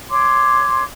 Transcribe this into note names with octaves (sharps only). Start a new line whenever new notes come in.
C#5 C6 D6